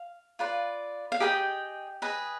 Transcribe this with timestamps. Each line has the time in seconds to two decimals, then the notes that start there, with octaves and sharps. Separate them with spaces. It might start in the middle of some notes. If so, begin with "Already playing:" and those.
Already playing: F5
0.39 F4 B4 D5
1.12 F5
1.20 G4 G#4 B4 D#5 G5
2.02 G#4 B4 D#5